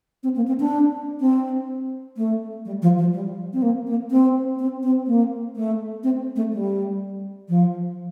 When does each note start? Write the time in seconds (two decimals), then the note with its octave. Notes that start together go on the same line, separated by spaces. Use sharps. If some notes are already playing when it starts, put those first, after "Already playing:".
0.23 C4
0.36 A#3
0.48 C4
0.60 D4
1.21 C4
2.17 A3
2.65 G3
2.82 F3
2.98 F3
3.13 G3
3.53 C4
3.62 A#3
3.87 A#3
4.11 C4
4.59 C4
4.83 C4
5.07 A#3
5.56 A3
6.04 C4
6.36 A3
6.53 G3
7.49 F3